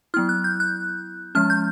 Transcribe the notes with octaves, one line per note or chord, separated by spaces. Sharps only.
F#3 B3 E4 F6
F#6
G6
F#6
F3 G#3 C#4 F6
G6